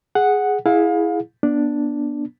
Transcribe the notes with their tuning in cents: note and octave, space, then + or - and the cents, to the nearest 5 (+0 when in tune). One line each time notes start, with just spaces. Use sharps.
G#4 +0 F#5 +0
E4 +0 G#4 +0 F5 +35
B3 -30 D4 +0